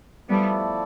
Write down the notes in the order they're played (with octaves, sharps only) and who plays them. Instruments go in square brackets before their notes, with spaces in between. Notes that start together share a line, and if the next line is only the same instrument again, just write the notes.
[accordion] F3 A3 E4 A4 D5 [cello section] G3 B3